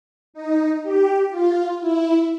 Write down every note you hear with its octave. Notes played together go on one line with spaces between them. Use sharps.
D#4
G4
F4
E4